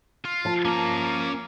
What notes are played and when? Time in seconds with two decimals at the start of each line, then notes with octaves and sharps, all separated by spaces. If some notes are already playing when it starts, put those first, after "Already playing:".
0.25 F4
0.45 F3 A5
0.65 A#3 C#4 A#5